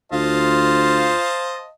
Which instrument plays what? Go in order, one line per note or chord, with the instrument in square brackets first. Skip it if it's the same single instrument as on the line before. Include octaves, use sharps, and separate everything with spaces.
[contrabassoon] D2 [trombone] F4 [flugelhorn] C5 [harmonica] D#5 F5 A5